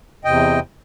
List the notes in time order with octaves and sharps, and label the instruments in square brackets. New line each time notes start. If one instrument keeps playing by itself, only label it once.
[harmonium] E2 C3 D#5 G5